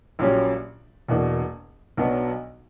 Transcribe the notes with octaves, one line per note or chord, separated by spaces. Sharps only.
A#1 A#2 F#3 C#4 G4
E1 E2 B2 A#3 D4
B1 B2 F#3 B3 D4